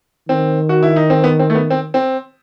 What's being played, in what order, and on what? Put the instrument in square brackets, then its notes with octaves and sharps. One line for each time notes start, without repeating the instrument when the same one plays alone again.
[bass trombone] D#3 [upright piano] C4
[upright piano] F#4
E4
D#4
C4
B3
C4
A3
B3
C4
C4